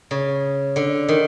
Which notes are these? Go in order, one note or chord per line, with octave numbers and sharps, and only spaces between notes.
C#3
D3
D#3